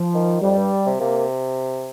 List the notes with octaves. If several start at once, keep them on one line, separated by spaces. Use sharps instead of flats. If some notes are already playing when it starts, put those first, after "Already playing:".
Already playing: F3
D#3
F2 G3
G2
C3
C3 A#3